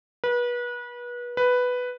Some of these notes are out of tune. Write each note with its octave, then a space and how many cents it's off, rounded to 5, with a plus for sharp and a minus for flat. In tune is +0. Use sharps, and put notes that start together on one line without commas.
B4 -30
B4 +5